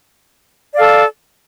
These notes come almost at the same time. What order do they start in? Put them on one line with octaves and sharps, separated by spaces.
D5 F5 A4